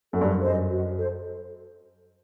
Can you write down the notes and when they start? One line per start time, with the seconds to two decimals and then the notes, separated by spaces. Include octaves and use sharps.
0.13 F#2 A4
0.21 G2
0.30 F#2
0.41 C5 D#5
0.70 F#4
0.97 A4 C5